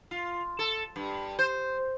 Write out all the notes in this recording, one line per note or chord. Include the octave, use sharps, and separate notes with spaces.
F4
A4
G2
C5